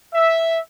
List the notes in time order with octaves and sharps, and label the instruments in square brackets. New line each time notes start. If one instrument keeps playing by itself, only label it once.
[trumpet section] E5